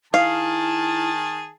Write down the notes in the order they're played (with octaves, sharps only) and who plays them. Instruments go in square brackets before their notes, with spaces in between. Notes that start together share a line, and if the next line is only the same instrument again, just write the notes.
[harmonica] D#3 G#4 [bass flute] E4 [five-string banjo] F5 [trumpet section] A5